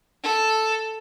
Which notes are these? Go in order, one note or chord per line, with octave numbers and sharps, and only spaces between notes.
A4